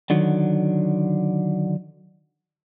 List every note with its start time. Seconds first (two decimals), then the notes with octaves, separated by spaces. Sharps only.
0.10 D3 D#3 F#3